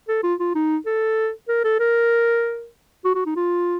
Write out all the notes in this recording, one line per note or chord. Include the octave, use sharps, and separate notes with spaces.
A4
F4
F4
D#4
A4
A#4
A4
A#4
F#4
F#4
D#4
F4